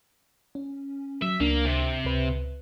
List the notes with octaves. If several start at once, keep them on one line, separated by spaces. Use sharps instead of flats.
C#4
F#3 E5
C#2 A#3 D4
C3
C#2 B4